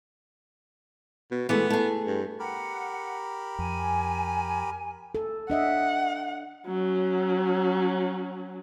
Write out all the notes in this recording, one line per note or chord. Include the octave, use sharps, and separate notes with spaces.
B2
E3 G#3 A3 B3
A3 G#4
G2
G4 A#4 F#5 B5
F2 G#5
A4
D4 D#5 E5 F#5
F#3 C#4